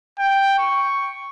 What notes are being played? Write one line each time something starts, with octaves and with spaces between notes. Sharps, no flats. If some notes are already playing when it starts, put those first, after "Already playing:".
G5
C#6